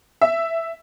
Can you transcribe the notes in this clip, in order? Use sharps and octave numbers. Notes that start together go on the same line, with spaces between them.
E5